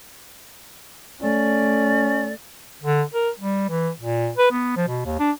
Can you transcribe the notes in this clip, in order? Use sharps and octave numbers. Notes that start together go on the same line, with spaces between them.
A3 C#4 D5
D3
A#4
G3
E3
A#2
B4
B3
F3
B2
D#2
D4